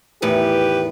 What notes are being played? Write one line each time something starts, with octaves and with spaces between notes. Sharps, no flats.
E2 A2 D#3 G4 B4